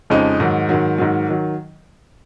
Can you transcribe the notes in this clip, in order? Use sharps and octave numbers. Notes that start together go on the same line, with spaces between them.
F2 C#3 F3 G#3 D#4
G#2 D#3 F#3
G#2 D#3 F#3
G#2 D#3 F#3
D#3 F#3